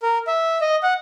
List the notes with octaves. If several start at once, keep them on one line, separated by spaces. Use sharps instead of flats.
A#4
E5
D#5
F#5